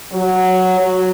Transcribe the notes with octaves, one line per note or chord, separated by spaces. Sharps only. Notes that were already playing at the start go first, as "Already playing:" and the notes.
F#3
F#3